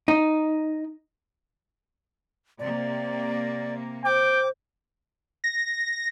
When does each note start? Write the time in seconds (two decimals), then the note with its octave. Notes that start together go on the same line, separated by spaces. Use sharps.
0.08 D#4
2.59 C3 A#3 D5
4.05 C5 G5 D6
5.44 A#6